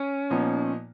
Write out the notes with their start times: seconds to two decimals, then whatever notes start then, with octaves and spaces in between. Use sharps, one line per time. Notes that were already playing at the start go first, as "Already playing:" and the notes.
Already playing: C#4
0.30 A#2 F3 B3 D#4